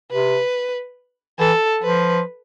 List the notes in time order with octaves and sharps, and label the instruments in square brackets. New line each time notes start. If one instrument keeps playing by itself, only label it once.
[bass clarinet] C3 [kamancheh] B4
[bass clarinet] E3 [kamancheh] A4
[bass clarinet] F3 [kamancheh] B4